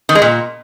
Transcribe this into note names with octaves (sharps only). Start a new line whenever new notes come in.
D#3
G#3
A#2